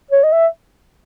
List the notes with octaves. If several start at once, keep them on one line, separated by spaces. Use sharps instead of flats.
C#5
D#5
E5